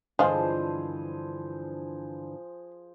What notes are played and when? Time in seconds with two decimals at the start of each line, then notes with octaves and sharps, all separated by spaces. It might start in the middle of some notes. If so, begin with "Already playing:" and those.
0.19 G2 D3 E3 F3 G#3 F4 G#4 C5